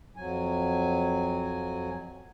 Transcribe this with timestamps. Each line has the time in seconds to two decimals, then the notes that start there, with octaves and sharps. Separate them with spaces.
0.16 F2 F#3 G#5